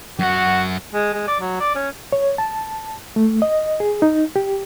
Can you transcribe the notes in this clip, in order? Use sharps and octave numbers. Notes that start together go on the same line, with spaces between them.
F#2 F#4 F#5
G#3
G#3
D5
F#3
D5
C#4
C#5
A5
A3
D#5
G#4
D#4
G4